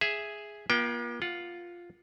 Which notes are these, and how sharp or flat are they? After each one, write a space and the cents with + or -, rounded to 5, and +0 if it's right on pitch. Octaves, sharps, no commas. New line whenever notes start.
G#4 +0 E5 +0
A#3 +45 F4 +0 G5 +0
F4 +0 F#5 +0